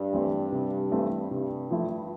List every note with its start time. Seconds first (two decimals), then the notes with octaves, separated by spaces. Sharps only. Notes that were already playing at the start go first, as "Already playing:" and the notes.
Already playing: G2
0.13 E3 A3 C4
0.52 C3
0.92 E3 A3 C4
1.31 G2 C3
1.71 F3 A3 E4